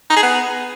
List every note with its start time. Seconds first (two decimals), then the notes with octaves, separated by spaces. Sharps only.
0.10 D#4
0.16 G#4
0.23 B3